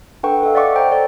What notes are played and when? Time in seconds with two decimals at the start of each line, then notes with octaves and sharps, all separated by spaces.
0.23 D4 A4 B4 F#5 G5 C#6
0.43 A4 D#5 F5
0.55 D5 E5 F#5 C#6 D6
0.74 C5 G5 A#5
0.91 A4 C#5 D5